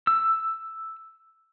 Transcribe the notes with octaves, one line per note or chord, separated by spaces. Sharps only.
E6